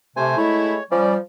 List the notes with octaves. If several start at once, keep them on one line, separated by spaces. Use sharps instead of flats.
C3 A3 C5 G#5
G#3 A3 E4 C#5
F3 G3 C#4 D5